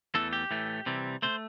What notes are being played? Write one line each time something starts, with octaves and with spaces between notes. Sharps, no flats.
E2 E3 A3 A4
G4
A2 E3 A3
C3 E3 G3
C3 A3 C5